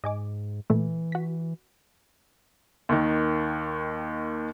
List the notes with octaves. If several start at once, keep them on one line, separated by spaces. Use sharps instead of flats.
G#2 D#5 G#5 D6
A#2 E3 A3
F#4 B6
D#2 D#3